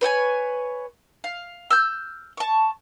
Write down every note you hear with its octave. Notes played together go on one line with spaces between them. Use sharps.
B4 C#5 G5 G#5
F5
E6 F6 G6
A5 C#6